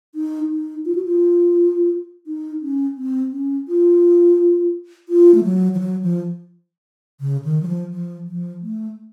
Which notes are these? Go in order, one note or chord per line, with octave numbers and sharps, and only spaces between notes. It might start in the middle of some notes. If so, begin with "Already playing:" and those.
D#4
D#4
F4
F#4
F4
D#4
C#4
C4
C#4
F4
F4
A3
F#3
F3
F#3
F3
C#3
D#3
F#3
F3
F3
F3
A3